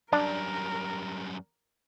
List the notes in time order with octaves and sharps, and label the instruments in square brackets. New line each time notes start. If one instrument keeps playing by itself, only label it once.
[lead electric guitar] F#2 G3 [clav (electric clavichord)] D4 [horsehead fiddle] A#4